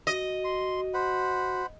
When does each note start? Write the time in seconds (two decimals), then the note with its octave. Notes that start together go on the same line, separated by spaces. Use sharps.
0.07 F#4 D#5
0.44 C6
0.94 C5 F#5 B5